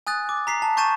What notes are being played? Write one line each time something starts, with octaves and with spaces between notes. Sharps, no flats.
G#5 D#6 F#6 A6
D6
A#5 B6 C7
A5
C#6 G6 A6 D#7 E7